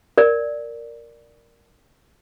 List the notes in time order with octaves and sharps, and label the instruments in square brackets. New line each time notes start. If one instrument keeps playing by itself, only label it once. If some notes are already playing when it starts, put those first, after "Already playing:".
[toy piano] A#4 D5